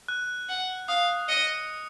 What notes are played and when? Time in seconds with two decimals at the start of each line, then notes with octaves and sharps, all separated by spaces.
0.08 F#6
0.49 F#5
0.88 F5 D#6
1.29 D#5 C#7